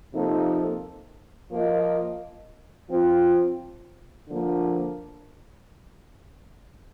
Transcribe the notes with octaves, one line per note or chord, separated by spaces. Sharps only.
C3 F3 A#3 D#4 A4
F3 A#3 F4 A#4 D#5
F3 C4 F4
D3 F3 A#3